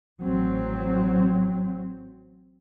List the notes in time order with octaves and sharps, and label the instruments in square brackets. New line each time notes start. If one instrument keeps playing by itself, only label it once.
[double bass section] A1 F#3 C4